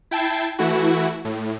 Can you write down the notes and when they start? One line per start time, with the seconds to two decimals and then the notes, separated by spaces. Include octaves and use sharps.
0.11 E4 G5 A5 G#6 C7
0.59 E3 A3 E4 F#4
1.25 A2